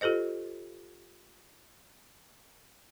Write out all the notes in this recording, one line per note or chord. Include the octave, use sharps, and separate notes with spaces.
F4 G4 A4 C5 D#5